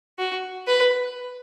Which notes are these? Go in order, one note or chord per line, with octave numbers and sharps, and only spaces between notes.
F#4
B4